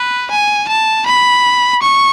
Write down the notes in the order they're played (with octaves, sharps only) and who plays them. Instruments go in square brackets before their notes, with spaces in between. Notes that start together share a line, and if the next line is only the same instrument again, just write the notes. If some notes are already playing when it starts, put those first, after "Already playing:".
Already playing: [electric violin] B4
G#5
A5
B5
C#6